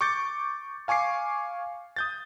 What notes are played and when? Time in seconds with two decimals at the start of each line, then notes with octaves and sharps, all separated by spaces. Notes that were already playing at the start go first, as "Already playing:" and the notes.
0.01 C#6 D6 G6 A6 C#7
0.88 F5 G#5 C#6 D6 C7
1.96 D#6 G6 A6